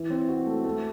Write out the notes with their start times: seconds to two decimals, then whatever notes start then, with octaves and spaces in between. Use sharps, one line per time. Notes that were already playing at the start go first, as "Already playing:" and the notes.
Already playing: E3
0.10 C4
0.29 F#4
0.46 A3
0.64 A3